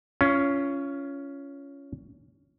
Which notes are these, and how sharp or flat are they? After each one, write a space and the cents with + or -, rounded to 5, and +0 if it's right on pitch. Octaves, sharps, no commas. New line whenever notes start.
C#4 +10 F4 -25